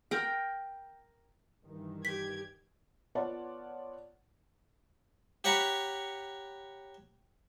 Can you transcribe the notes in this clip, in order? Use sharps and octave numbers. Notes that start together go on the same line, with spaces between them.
A#4 G5
G2 D#3 E3
G4 G#6 B6
B3 F4 C#5 D5 F#5 A5
G4 C#5 F#5 A#5 B5 C#6